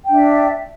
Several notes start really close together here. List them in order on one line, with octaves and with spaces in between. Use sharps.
G5 D4 E5